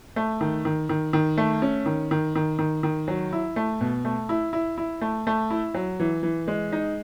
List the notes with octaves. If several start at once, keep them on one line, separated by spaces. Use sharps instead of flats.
A3
D#3
D#3
D#3
D#3
A3
C#4
D#3
D#3
D#3
D#3
D#3
F#3
E4
A3
B2
A3
E4
E4
E4
A3
A3
E4
F#3
E3
E3
G#3
D#4